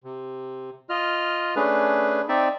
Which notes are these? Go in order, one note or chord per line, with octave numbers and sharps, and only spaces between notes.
C3
F4 D#5 F6
A3 C#4 D4 G#4 B4
C4 D#4 D5 E5